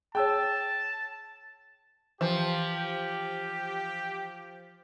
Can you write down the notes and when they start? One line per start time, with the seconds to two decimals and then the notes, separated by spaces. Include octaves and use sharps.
0.15 G#4 C#5 G5 A5 E6
2.21 E3 F3 G4